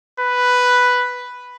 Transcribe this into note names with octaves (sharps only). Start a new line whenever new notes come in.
B4